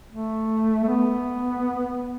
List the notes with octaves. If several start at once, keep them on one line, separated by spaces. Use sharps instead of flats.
A3
A3
B3